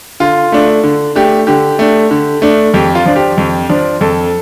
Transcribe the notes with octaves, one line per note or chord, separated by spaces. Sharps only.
D3 F4
A3 D4
D3
A3 D4 G4
D3 G4
A3 D4
D3
A3 D4
F2 G4
F4
F3 D4
G4
F2
F3 D4
F2 A4